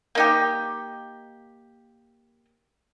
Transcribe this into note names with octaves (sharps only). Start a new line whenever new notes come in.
A#3 D#4 G4